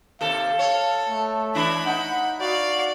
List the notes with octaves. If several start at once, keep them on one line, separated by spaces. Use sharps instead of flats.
D#2 C3 A4 F5
A4 C#5
A3
E3 D4 E4 B5
D#4 F#5
F#4 D5 F5